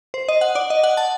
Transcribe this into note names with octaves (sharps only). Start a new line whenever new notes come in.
C5
D#5
F#5
D5
D#5
F#5
A5